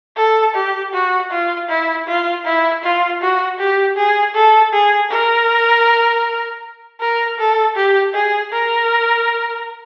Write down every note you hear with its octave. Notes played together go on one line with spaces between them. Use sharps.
A4
G4
F#4
F4
E4
F4
E4
F4
F#4
G4
G#4
A4
G#4
A#4
A#4
A4
G4
G#4
A#4